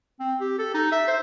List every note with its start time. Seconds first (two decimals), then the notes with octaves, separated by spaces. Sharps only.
0.20 C4
0.40 G4
0.59 A4
0.74 D#4
0.92 E5
1.08 C5